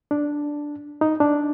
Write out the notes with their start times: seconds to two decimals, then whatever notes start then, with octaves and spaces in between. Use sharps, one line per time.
0.11 D4
1.01 D#4
1.20 D4